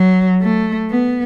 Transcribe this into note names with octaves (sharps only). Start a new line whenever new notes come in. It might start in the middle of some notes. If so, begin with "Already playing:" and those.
Already playing: F#3
A3
B3